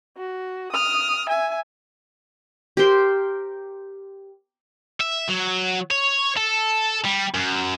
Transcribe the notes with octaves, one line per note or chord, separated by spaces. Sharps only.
F#4
D#6 F6
E5 G#5
G4 A#4 C5 C6
E5
F#3
C#5
A4
G3
F#2